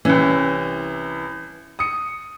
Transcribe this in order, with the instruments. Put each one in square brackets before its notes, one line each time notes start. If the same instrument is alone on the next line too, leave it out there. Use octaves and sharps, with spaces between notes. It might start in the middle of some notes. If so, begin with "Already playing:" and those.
[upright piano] C2 E3 [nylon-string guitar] C#4
[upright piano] D#6 C#7